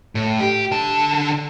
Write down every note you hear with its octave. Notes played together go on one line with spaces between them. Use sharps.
A2
G4
D3 A5